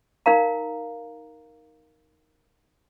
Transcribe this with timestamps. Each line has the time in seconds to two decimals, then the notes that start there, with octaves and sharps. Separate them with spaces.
0.26 D#4 A#4 F5 A#5